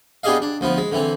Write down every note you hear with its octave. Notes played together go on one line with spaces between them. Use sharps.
B3 D4 G4 G#4 D#5 F5
D4
D2 F3 B3
G#3
D3 E3 C4